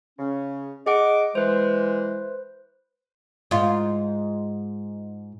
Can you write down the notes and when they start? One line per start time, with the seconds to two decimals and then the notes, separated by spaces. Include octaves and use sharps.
0.18 C#3 C#4
0.86 G#4 D#5 F#5 D6
1.35 E3 G#3 B4 C5
3.51 G#2 F4